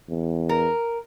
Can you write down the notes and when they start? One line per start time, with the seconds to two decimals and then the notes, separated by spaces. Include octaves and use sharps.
0.10 E2
0.49 A#4